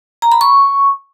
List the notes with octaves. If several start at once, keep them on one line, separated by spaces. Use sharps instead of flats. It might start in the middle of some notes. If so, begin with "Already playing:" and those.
A#5
B5
C#6